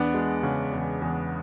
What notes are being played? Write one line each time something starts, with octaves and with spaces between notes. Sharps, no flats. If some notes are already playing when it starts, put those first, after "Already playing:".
Already playing: E2 B3 D4
G#3
C#3
E2
E2